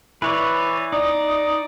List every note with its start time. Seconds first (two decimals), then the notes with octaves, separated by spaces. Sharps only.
0.22 E3 B4 C#5 D5
0.92 D#4 D5 D#6